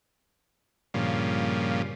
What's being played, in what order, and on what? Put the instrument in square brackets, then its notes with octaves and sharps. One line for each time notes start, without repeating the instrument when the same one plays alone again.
[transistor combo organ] G2 A#2 C#3 F3